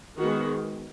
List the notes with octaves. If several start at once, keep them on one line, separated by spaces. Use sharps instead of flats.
D#3 G#3 B3 F#4